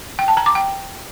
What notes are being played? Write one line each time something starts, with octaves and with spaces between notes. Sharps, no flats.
G5
A5
A#5
D6
G5